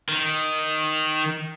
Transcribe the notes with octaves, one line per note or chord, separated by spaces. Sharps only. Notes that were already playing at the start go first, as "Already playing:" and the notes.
D#3